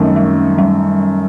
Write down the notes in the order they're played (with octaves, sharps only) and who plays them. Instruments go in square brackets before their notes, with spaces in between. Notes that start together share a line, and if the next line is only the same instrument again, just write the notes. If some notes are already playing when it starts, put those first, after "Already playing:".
Already playing: [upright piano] F#2 D#3 A3 [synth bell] F#3 G3
[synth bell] G3
G3